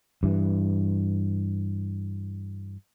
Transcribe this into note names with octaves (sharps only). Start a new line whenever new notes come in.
G2 E3